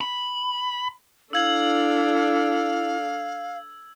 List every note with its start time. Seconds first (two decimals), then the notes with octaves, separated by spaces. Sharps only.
0.01 B5
1.33 D4 E4 A4 F5 E6 G#6 F#7